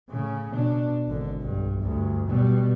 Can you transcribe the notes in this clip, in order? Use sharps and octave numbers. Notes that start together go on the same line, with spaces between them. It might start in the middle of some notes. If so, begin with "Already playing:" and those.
A2 C#3
B2 D4
G#1 D3
B1 G2
D2 G2
B2 G3